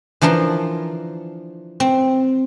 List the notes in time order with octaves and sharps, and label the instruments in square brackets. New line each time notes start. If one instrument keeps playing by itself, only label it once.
[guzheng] E3 F3 D4 A#4 C6
C4